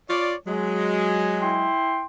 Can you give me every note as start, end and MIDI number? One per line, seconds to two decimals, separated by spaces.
0.10 0.34 65
0.10 0.34 73
0.10 0.34 74
0.47 1.71 54
0.47 1.71 56
1.42 2.06 64
1.42 2.06 79
1.42 2.06 84